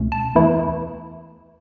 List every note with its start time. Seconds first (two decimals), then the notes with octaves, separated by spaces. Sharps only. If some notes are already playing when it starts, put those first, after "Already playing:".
Already playing: C#2 B2 A3 C#4
0.12 A5
0.35 E2 E3 A3 E4